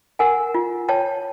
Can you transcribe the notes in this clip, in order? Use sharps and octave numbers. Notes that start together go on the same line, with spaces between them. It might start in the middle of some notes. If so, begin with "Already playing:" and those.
A#4 F#5 G#5
F4
C#5 G5 A5